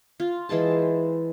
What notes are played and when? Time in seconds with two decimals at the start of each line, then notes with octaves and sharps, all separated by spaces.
0.20 F4
0.49 E3 G#3 C5 A5